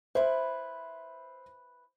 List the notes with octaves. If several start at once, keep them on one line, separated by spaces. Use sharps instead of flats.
E4 B4 C5 E5